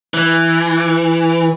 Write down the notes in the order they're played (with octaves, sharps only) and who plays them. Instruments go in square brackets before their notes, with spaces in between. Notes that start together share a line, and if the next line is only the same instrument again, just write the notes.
[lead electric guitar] E3